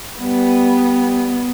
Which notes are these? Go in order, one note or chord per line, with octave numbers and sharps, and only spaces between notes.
G3 B3